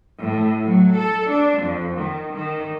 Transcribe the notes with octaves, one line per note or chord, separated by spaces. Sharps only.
A2
F#3
A4
D4
F2
D#3
D#3